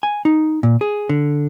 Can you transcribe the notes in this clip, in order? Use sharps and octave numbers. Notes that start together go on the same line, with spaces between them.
G#5
D#4
A#2
G#4
D3